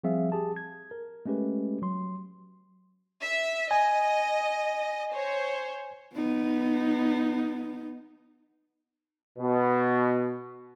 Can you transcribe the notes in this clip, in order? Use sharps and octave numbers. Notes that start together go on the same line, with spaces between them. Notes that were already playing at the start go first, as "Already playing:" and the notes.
F3 G3 C4 G#4 E5 F5
G4 G#4 A5
G#6
A#4
G#3 A3 C#4 G4 B4
F#3 C6
E5
D#5 G#5
C5 C#5
B3 D#4
B2